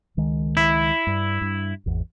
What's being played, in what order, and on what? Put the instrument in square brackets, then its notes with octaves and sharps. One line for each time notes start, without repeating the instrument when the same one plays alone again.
[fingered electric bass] C#2 D#3 G#3
[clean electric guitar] E4
[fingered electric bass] G2
G2
G#1 E2